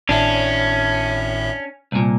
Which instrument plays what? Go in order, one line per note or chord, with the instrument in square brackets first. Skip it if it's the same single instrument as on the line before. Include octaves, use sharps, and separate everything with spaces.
[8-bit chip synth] G#1 A2 E5 [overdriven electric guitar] C#4 [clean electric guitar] D4
[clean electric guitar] C2 A#2